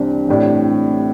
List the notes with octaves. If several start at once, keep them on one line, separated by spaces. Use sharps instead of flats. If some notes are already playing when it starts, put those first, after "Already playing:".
Already playing: C2 C3 E3 C4 D4
A1 A2 G3 D4